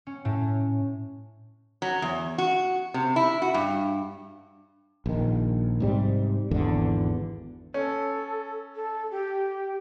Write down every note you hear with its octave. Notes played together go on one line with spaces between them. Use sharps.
C#4
A2
F#3
E2
F#4
C3
E4
F#4
G2
A#1 D#3
G#2 C3 G3
G#1 E2 D3
C#4 A4
A4
G4